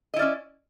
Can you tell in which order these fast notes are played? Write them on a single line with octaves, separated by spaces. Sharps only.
D#5 E4 D5 C#4